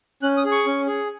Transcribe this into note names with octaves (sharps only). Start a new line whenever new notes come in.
C#4 F#6
D#6
G#4
C#6
C#4
G#4